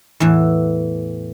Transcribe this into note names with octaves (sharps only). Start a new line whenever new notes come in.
E2 A2 E3